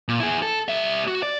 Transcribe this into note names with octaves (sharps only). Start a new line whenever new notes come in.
A#2
E4 G#4
A4
G3 E5
F#4
D5